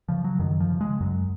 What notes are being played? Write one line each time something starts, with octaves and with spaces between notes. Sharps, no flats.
C#3 F3
F#3
F#2 D#3
F3
C#3
G#3
F#2 F#3